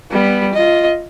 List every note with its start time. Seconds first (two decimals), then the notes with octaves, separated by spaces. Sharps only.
0.11 G3 B3
0.53 F4 D#5